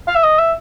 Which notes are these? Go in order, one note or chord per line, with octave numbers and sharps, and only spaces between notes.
F5
E5
D#5
E5